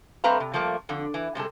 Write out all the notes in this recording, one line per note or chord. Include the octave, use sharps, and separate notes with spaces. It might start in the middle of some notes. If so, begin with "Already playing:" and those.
G3 A3 C4 B4 F5 A#5
C3
F3 G3 A3 A#3
F2 D3
E3
C3 G3 G#3 A4